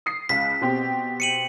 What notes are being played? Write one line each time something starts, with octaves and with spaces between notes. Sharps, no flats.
D#6 C7
C#2 F5 B6
B2 C4 G4
C#7 D#7 F#7